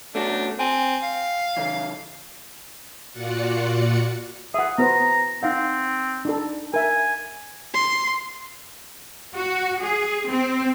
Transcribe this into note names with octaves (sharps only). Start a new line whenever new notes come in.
A3 C#4 D4 F#4
C4 G5 G#5
F5
C#3 E3
A#2 F4 F#4 D5 F#5 C#7
G#4 E5 F#5
B3 B4 C5 A#5
C4 D#4 F5 F#5
D4 D#4 A4
A#4 E5 G#5
C6
F#4
G#4
C4